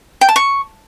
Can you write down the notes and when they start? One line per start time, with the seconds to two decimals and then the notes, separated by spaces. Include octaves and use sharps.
0.21 G5
0.29 A5
0.36 C#6